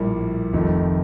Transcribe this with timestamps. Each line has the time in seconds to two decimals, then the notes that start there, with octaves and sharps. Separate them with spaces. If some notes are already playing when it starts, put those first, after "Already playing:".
Already playing: A#1 A2 G3 A#3
0.53 F1 F2 D#3 A3